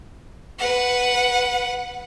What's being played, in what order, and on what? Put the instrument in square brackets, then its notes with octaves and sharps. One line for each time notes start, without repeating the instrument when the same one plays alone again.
[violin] B4 F#5